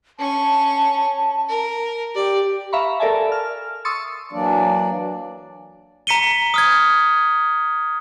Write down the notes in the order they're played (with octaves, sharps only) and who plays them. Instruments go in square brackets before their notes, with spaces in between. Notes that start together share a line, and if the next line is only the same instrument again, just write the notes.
[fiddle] C#4 C#6 [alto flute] A5
[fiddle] A#4
[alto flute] G4 [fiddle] D5
[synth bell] E5 F5 A#5 B5 C#6
A4 A#4 D5 E5 G#5 A5
F6
C6 C#6 D#6 E6 A6 C#7
[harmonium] E3 F#3 A#3 D4 D5
[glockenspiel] A#5 B6 C#7 D#7 G7
D#6 F6 G#6